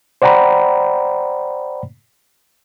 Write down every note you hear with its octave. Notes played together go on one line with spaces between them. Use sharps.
C5 D5 F#5 G5 A#5 B5